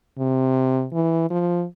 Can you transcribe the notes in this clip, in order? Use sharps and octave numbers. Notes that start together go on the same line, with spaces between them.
C3
E3
F3